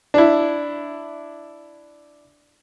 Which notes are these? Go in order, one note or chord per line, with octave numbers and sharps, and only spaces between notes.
D4 E4